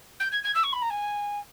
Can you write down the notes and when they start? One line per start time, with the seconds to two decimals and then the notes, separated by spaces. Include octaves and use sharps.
0.20 G6
0.32 G#6
0.44 G#6
0.55 E6
0.63 C#6
0.73 B5
0.82 A#5
0.90 G#5